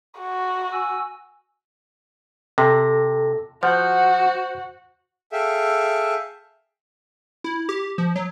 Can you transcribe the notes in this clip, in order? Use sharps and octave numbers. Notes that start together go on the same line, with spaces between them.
F#4
G#5 E6
C3 A4 A#6
F3 F#4 C5 F#5 G6
G#4 A4 E5 F5 G5
E4
G4
F3
F#3